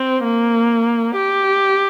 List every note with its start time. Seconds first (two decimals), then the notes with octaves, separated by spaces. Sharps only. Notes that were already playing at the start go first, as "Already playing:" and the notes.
Already playing: C4
0.23 A#3
1.15 G4